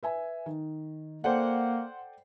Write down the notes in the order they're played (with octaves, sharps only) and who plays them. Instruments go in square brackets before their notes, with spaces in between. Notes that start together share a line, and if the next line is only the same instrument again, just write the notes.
[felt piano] B4 E5 G#5
D#3
[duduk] A#3 [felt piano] A4 D5 G5 [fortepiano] C5 F#5